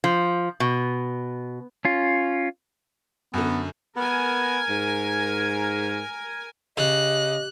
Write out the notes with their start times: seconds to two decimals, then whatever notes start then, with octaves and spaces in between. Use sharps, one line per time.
0.04 F3
0.60 B2
1.85 C#4 F4
3.34 F#2 D3 B3
3.97 B3 A#4 G#5
4.69 G#2
6.78 C#3 G4 D#5 F#6